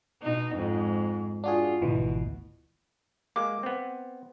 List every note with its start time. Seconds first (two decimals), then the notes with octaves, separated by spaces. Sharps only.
0.23 B2 D#4
0.55 F2 G#2
1.44 D4 F4 F#4 G#4
1.81 G#1 D2 B2 E3
3.36 G#3 A#3 D6
3.63 B3 C4